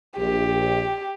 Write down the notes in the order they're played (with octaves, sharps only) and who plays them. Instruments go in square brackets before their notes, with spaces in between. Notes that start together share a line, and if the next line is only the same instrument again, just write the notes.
[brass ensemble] A#1 [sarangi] G4